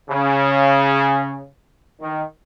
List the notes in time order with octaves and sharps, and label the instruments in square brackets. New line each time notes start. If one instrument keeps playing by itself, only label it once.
[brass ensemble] C#3
D#3